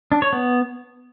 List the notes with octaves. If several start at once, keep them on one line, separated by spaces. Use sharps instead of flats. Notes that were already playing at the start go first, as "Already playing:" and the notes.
D4
C#5
B3